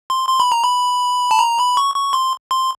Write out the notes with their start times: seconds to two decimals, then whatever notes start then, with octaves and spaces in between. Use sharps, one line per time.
0.10 C6
0.29 C6
0.40 B5
0.52 A#5
0.64 B5
1.31 A5
1.39 A#5
1.59 B5
1.77 C#6
1.95 C#6
2.13 C6
2.51 C6